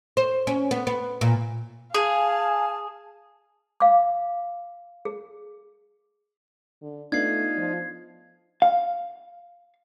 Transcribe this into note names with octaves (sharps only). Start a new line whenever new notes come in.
C5
C#4
B3
B3
A#2
G#4 F5 G#5 A5 D#6
F5 D6
G#4
D3
A3 B3 D4 D#4 F4 G#6 C7
F3
F5